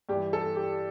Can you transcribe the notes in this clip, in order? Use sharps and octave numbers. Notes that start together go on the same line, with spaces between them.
G2 E3 G4
A4
G4